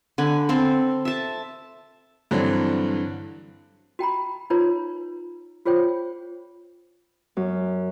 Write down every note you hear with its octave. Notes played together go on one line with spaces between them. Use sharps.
D3 G#5 B5
C4 A4
E5 A5
G2 D3 E3 F#3 C4
F#4 G5 A#5 B5
D#4 F4 B4 C#5 A#5
F4 G#4 C5 C#5 G5
F#2